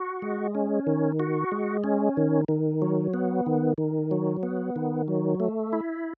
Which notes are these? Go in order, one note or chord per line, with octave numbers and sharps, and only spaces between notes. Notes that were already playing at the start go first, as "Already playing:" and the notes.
Already playing: F#4
G#3
C#4
D#3
F#4
G#3
C#4
D#3
D#3
F#3
B3
D#3
D#3
F#3
B3
D#3
F#3
A3
E4